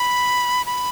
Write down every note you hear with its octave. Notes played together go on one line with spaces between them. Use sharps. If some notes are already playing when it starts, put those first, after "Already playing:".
Already playing: B5
B5